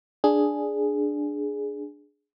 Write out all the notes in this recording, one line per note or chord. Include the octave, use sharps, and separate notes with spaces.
D4 G#4